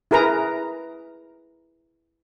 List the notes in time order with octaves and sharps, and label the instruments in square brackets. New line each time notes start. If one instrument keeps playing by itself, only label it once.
[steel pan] E4 G#4 A#4 B4 A#5